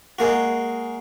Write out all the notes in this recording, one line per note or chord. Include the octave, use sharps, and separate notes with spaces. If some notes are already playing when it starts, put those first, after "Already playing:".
G#3 A#3 F#4